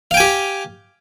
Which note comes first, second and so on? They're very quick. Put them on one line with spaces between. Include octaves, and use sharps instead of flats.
F5 G5 G#5 G4